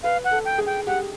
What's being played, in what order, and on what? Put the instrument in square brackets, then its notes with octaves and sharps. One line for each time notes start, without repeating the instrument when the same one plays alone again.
[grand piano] B4 [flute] F5
[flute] F#5
[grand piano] A4
[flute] G5
[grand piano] G#4
[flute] G5
[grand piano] G4 [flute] F#5